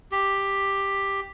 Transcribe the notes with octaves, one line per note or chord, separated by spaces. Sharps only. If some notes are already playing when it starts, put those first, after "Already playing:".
G4